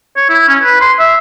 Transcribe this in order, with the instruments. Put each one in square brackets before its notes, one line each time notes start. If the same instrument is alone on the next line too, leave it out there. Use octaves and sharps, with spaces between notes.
[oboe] C#5
E4
C#4
B4
C6
E5